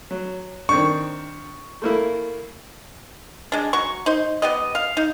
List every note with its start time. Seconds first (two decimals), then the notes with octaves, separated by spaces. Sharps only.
0.11 F#3
0.69 D#3 C4 D4 C#6
1.82 A3 A#3 E4
3.52 G#3 D4
3.73 F#3 C#6
4.06 D#4 C5
4.42 B3 G4 D#5
4.75 F5
4.97 D#4